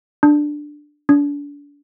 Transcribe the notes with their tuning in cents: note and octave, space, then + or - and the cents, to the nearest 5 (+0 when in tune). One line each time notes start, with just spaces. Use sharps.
D4 +10
D4 -35